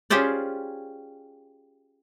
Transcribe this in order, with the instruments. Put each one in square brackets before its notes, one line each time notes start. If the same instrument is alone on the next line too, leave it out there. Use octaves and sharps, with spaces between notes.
[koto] C#4 F4 G4 G#4 C5 D5